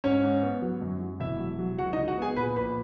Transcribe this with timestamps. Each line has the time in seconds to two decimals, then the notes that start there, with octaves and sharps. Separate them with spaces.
0.04 G#2 C#4 C#5
0.23 G#2
0.42 B3
0.62 F#3
0.81 F#2
1.01 F#3
1.20 E1 E4 E5
1.40 F#3
1.59 F#3
1.78 C#2 F#4 F#5
1.93 D#4 D#5
1.98 C#2
2.08 F#4 F#5
2.17 B3 G#4 G#5
2.36 A#2 B4 B5
2.56 A#1 B4 B5